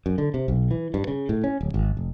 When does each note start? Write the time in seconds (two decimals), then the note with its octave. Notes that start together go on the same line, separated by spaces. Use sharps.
0.06 F#2
0.18 D3
0.34 C3
0.48 B1
0.71 E3
0.94 G2
1.08 C#3
1.29 A2
1.44 C#4
1.61 D1
1.74 G#1
1.97 F1